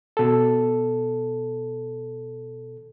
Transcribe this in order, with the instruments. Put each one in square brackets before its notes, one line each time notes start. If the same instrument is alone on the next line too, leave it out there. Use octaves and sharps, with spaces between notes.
[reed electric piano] B2 A4